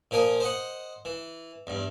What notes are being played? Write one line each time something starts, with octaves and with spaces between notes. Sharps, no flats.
A#2 F3 A#4 G#5 D#6
C5 D#5 F#5
E3
E2 G2